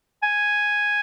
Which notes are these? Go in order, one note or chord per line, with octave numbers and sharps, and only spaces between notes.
G#5